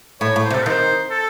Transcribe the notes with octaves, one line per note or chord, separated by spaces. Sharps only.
A2 C#5
A2
C5
C3
A4
D#3 C5
A4